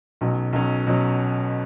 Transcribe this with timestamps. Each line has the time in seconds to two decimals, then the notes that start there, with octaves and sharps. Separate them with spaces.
0.21 B1 B2 F#3 C#4
0.53 B1 B2 F#3 C#4
0.87 B2 F#3 C#4